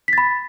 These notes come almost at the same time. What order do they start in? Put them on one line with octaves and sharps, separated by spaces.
B6 A6 B5